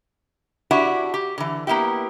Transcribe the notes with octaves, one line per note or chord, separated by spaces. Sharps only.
D4 E4 F#4 G4 E5
G4
D3 E3
A#3 B3 E4 G4